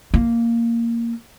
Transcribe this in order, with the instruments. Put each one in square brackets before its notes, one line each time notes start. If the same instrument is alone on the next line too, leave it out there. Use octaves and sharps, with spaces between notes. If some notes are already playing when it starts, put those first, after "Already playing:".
[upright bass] A#3